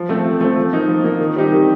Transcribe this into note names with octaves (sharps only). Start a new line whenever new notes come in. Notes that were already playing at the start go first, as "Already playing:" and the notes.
Already playing: F3
A3 C4
F3
A3 C4
F3
A#3 D#4
F3
A#3 D#4
D#3
G3 C4 D#4 G4
D#3